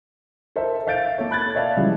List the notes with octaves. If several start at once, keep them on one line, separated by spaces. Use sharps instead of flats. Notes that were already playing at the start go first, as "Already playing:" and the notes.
A4 A#4 C5 E5
E5 F5 G6 A6 D7
A#3 A4 C#5
B5 F#6 G#6 A6
C#5 D5 E5 F5 A5
C#3 E3 F3 G3 G#3